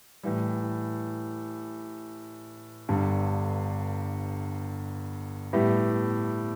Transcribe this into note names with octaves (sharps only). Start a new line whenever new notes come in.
A2 E3 G3
G1 G2 D3 G3
A2 G3 B3 E4 G4